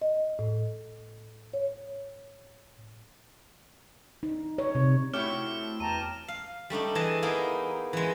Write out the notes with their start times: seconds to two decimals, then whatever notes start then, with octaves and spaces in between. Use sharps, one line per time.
0.02 D#5
0.39 A2
1.54 C#5
4.23 D#4
4.58 C#5
4.75 C3
5.13 A3 C4 E4 F#4 G4 C#5 D6 F6
5.80 E2 G5 A5 A#5 D#7
6.28 F5
6.70 G3 A3 D4 D#4
6.95 E3 G#4 D#5 A5
7.23 A#3 B3 D#4 E4
7.93 E3 G#3